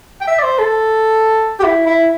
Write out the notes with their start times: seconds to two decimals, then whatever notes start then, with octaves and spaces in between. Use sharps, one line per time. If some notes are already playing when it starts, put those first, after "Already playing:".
0.21 G5
0.28 E5
0.39 D5
0.43 C5
0.59 A4
1.60 G4
1.64 E4
1.87 E4